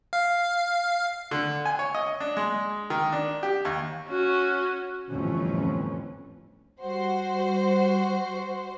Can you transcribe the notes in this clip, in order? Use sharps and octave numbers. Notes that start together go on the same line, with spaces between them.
F5
D3
G#5
C#5
D#5
D4
G#3
D#3
D4
G4
D#2
C#4 F#4
G1 F2 A2 E3 C#4
G3 F#4 C5